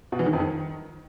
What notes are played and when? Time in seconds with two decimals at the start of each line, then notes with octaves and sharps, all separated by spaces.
0.12 B2
0.19 E3
0.26 D#3
0.33 F2
0.40 D#3